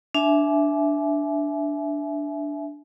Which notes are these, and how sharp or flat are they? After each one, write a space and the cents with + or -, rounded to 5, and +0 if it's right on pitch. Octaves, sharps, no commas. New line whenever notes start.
D4 +0 E5 +0 G#5 +35